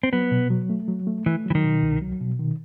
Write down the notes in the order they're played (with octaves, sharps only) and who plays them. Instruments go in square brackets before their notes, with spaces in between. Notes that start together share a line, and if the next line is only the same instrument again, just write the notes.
[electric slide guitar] C4
[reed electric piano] F#3 [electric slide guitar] B3
[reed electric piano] B2
F#3
A3
F#3
A3
[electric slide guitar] E3 [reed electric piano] A3
[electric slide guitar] E3 [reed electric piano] F#3
[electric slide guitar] D#3
[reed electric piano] B2
C2
F#3
B2
D#3